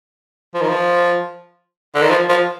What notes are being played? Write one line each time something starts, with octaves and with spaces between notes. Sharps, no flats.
F3
D#3
F3
D3
D#3
F3
F3